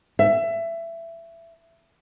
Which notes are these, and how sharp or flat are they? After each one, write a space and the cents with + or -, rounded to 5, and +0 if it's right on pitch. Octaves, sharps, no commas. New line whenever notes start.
E5 +20